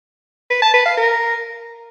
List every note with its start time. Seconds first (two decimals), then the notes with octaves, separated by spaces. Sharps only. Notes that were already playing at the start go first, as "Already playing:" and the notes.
0.50 B4
0.62 A5
0.74 B4
0.86 F5
0.97 A#4